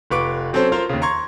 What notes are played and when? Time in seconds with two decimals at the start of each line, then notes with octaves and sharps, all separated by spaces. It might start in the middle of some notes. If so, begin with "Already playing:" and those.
0.11 F1 F4 B4 C#6 D6 D7
0.53 F#3 C4 C#4 A4 C5
0.72 F4 A#4 C5 F5
0.89 D#2 C#3
1.02 A#5 C6 C#6 G#6